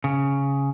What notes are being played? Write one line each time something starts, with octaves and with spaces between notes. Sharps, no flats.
C#3